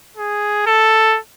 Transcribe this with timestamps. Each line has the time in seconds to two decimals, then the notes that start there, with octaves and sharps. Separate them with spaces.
0.17 G#4
0.66 A4